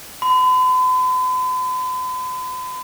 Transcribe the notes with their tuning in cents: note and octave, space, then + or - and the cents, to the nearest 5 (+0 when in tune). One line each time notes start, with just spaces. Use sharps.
B5 +45